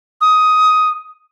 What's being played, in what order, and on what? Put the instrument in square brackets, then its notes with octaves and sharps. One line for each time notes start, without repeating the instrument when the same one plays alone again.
[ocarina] D#6